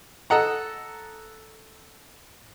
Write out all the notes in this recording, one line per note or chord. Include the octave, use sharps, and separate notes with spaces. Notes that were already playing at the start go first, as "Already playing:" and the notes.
A4 D#5 F#5 A#5